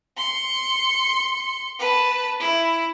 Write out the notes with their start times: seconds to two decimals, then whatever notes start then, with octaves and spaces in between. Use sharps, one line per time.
0.17 C6 C#7
1.79 B4 A5
2.40 E4